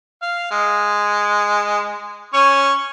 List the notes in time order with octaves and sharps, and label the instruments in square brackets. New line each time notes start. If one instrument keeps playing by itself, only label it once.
[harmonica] F5
G#3
C#4 C#5